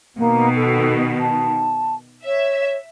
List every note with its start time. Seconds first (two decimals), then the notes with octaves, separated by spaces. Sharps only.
0.18 B2 D#3 A#3
0.55 A4
1.20 A5
2.26 C#5 E5